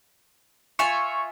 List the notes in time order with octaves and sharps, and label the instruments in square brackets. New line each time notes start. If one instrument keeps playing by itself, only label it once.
[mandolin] F4 E5 G#5 [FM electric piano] C#6